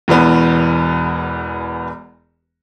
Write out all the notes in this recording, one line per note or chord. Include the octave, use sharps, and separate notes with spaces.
E1 E2 E3 B3